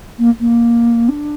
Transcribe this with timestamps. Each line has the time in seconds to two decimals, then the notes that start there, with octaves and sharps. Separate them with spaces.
0.18 A#3
0.40 A#3
1.08 D4